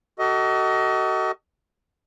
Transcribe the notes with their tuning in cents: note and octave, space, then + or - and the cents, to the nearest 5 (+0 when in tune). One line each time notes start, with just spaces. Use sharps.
F#4 +35 A4 +30 D#5 +20